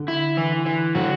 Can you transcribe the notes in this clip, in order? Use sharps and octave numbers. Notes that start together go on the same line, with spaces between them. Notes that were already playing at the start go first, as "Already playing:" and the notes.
Already playing: D3
E4
E3
E3
D3 F#4